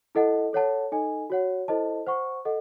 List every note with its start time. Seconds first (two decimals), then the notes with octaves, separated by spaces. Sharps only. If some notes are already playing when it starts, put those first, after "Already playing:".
0.15 E4 A4 D#5 F#5 A5
0.53 A4 C#5 F#5 A5
0.92 D#4 A4 D#5 G#5
1.30 F#4 C#5 F#5
1.68 E4 A4 C5 D#5 A5
2.07 C5 F#5 C#6
2.45 A4 D#5 F#5